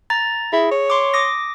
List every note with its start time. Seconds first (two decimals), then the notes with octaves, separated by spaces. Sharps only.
0.10 A#5 A6
0.53 E4 G#4
0.71 C#5
0.90 C6 D6
1.14 D6 D#6 A#6